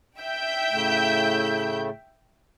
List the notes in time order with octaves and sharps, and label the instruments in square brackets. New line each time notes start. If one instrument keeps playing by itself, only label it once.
[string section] E5 G5 G6
[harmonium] A2 C#3 A3